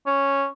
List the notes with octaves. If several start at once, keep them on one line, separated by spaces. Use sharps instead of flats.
C#4